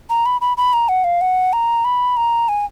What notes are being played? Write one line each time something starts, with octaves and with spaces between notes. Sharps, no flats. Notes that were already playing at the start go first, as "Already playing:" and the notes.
A#5
B5
B5
B5
A#5
F#5
F5
F#5
A#5
B5
A#5
G#5